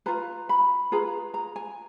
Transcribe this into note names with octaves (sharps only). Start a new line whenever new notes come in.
F4 B4 A#5
B5
F4 G#4 B4 A#5
A#5
G#5